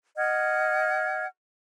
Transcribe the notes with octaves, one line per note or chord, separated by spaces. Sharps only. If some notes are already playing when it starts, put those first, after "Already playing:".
D#5 F#5 F6 G#6